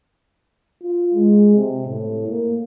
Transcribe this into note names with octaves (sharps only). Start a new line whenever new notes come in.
F4
G#3
C3
A2
A#3